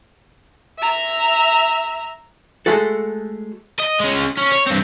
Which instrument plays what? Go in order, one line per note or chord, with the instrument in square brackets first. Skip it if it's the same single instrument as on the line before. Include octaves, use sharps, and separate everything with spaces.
[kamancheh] E5 A#5
[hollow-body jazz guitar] G#3 A3 F#4 A4
[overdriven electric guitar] D#5
G#3 C#4
C#4
C#5
G2 C4